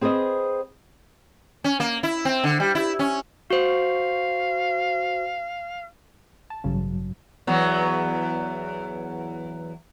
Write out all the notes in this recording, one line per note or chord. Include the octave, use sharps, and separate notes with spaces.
C4 G#4 B4 C5 D#5
C#4
A#3
E4
C4
D3
G3
E4
C#4
F#4 C5 F5
A5
A1 G2 C#3 F#3
E2 F#3 B3